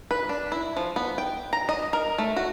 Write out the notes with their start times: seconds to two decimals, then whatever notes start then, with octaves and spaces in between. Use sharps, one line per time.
0.11 B4
0.29 D4
0.52 E4
0.77 F3
0.96 B3
1.18 G5
1.53 A#5
1.69 D#5
1.93 A#4
2.18 A3
2.36 F#4